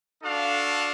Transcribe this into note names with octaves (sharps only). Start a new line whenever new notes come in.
D4 F#4 A4 F5